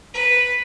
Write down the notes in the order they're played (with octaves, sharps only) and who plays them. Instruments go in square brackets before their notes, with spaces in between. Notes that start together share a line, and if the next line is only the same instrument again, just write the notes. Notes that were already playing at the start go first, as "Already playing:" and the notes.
[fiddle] B4